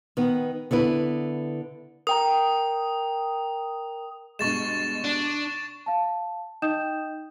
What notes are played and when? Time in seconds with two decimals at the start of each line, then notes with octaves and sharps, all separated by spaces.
0.17 D#3 B3
0.71 D3 B3 E4 B4
2.07 A#4 G5 A#5 D#6
4.39 G2 B2 G#3 C#6 A6 E7
5.05 D4
5.86 F5 A5
6.62 D#4 D#5 G5 D#6 G6 E7